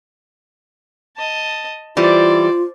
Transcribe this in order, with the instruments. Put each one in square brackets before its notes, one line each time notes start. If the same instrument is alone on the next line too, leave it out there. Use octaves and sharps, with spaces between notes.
[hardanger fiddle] D#5 A5
[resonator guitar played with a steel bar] E3 G3 [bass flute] F4 [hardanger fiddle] C5 D5